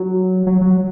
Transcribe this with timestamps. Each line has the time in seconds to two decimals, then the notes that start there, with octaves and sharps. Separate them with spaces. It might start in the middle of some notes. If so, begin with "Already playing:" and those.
Already playing: F#3
0.47 F#3
0.61 F#3